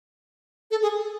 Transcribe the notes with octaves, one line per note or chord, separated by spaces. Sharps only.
A4
G#4